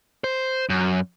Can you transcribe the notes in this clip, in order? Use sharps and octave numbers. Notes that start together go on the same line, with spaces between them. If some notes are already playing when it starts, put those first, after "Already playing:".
C5
F#2